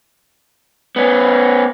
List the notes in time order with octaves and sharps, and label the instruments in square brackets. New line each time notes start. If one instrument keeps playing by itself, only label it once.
[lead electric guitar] B3 C#4